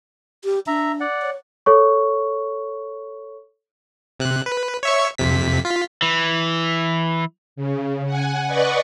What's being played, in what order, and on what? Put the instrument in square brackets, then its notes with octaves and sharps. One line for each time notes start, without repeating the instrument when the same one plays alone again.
[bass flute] G4
[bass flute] D4 [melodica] E5 A#5
[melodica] D5 F#5
[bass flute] C#5
[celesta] A4 C#5 C#6
[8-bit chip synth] C3 F#6
B4
C#5 E5 C#6
F2 C3 B6
F4 B6
[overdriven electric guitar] E3
[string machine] C#3
F#5 G#5
B4 D5 D#5 F#5 C#6